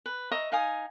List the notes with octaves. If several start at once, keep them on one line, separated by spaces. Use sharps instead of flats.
B4
D#5 E5 A#5 C#6
D#4 F5 G#5 D#6